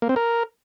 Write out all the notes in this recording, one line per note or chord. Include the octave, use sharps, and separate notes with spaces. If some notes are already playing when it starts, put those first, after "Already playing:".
A#3
C4
A#4